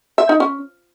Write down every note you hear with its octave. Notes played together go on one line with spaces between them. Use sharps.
E5
D#4
C#4